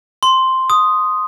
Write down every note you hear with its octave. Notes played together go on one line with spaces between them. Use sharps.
C6
D#6